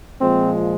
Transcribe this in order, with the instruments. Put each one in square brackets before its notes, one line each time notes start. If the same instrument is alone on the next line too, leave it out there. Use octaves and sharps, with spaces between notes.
[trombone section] A#2 F3 G#3 C4